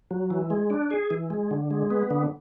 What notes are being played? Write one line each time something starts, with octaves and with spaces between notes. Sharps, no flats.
F#3
E3
G#3
D4
G#4
E3
G#3
D3
G#3
B3
D3